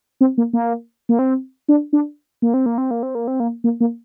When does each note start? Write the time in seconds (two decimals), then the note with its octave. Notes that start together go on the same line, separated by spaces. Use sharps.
0.21 C4
0.38 A#3
0.53 A#3
1.09 A#3
1.19 C4
1.68 D4
1.93 D4
2.42 A#3
2.54 C4
2.66 A#3
2.78 C4
2.91 A#3
3.03 C4
3.15 A#3
3.28 C4
3.40 A#3
3.64 A#3
3.81 A#3